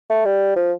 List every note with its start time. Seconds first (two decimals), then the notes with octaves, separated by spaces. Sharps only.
0.10 A3
0.25 G3
0.56 F3